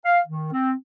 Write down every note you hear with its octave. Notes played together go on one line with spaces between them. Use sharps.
F5
D#3
C4